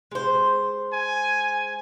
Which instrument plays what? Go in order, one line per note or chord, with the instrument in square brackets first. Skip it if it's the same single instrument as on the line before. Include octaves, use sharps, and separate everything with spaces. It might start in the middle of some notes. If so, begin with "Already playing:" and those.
[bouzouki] G#3 C5
[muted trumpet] G#5